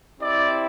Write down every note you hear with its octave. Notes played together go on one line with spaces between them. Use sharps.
C4 E4 G4 D5